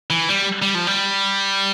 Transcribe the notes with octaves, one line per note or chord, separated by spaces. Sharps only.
E3
G3
G3
F3
G3